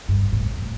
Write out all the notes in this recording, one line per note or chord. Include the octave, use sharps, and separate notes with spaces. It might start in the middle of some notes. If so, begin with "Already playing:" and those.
G2
A2
A2